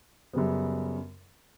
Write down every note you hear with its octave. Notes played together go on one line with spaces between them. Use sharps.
F#2 C#3 G3 B3